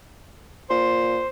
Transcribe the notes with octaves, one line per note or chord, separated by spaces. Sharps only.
A#2 C5